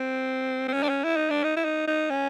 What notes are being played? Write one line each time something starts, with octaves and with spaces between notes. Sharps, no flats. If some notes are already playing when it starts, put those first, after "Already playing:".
Already playing: C4
C4
C#4
D4
C#4
E4
D#4
D4
D#4
E4
D#4
D#4
C#4